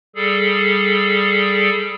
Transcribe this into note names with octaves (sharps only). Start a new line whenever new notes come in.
G3 G#4 A4